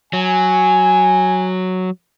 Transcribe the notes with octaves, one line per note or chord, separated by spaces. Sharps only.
F#3 G#5